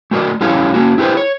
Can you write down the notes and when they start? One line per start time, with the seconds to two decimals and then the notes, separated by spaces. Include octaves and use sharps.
0.11 A3 F#4 A#4 D5 D#5
0.41 G3 C#4 E4 A4 C#5 F5
0.74 A#3 C#4 F#4
0.98 E4 G4 G#4 B4 C5
1.17 C#5